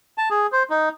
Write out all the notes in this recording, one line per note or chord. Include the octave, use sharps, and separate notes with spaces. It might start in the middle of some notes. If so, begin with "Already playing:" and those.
A5
G#4
C5
D#4